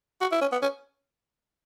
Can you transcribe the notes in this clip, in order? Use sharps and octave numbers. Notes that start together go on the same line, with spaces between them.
F#4
E4
C#4
B3
C#4